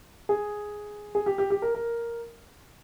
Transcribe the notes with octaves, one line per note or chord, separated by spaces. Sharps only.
G#4
G#4
G4
G4
G4
A#4
A#4